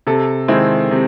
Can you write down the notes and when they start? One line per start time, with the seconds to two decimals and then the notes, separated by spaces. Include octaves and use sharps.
0.07 C3 A4
0.48 D#3 G#3 C4 E4
0.91 C3